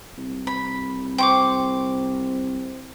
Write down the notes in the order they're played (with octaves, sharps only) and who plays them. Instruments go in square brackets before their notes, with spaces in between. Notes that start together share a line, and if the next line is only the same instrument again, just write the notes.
[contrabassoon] C2
[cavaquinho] B5
[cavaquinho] C5 C#6 [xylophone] G5 D6